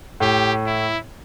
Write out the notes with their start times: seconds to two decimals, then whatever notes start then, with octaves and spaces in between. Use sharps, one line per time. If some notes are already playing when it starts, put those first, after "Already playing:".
0.20 A2 G4
0.66 E4